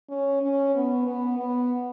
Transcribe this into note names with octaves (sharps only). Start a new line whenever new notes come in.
C#4
C#4
B3
B3
B3